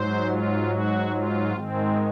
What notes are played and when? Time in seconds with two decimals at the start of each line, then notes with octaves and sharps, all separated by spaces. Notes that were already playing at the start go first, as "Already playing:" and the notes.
Already playing: G#2 F#3 C5
0.26 F4
0.67 F#4
1.11 F4
1.53 G#2 D#3 G#3 C4